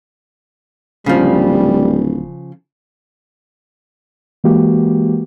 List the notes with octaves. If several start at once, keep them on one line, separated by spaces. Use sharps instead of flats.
D1 C#3 F3 G3
E3 G#3 A#3 F#4 G4